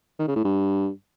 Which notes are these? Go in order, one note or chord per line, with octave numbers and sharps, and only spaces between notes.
D#3
C#3
A2
G2